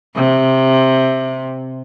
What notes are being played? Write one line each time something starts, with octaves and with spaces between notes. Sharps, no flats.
C3